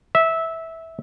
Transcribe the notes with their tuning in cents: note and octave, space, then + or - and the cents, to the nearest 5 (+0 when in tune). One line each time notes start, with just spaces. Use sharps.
E5 -15